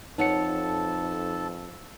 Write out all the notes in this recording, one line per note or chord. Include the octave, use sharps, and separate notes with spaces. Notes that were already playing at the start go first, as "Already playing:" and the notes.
F2 D#4 A4 B4 C#5 F#5 A5 C#7